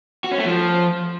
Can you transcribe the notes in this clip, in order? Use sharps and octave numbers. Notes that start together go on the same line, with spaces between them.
F#4
C#4
A3
F3